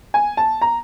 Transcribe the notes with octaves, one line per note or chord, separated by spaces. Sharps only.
G#5
A5
A#5